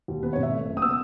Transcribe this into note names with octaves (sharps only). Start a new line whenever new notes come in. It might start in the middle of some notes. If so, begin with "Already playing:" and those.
D#2
B3 B4
C#5
G#1
E5
A3
F#1
D#6
B3 E6